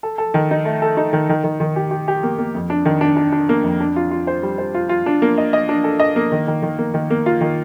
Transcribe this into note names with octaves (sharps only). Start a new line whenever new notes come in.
A4
A4
D#3
D#4
A3
A4
D#4
D#3
D#3
D#3
D#3
G4
G4
G4
A#3
A#3
F2
D4
D#3
D4
D4
D4
A#3
F2
D4
F4
F4
C5
G3
C5
F4
F4
D4
A#3
D#5
D#5
D4
A4
D#5
A#3
D#3
D#3
D#3
A#3
D#3
A#3
F4
D#3